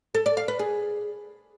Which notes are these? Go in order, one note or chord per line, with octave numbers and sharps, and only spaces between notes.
A4
D5
F5
B4
G#4